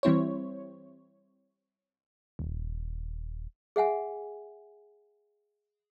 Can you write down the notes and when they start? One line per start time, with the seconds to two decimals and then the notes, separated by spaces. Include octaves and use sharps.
0.03 E3 G3 C4 E4 C5 C#5
2.39 D#1
3.76 G#4 E5 F#5 G#5